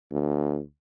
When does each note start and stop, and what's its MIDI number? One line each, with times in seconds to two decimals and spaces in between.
0.11 0.59 38